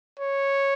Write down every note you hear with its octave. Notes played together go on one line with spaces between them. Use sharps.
C#5